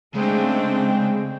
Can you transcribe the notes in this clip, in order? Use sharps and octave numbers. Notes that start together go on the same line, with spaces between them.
C#3 G#3 A3 C4 D4 G5